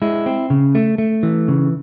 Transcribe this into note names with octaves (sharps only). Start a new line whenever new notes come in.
G#3 E4
C4
C#3
A3
A3
E3
C#3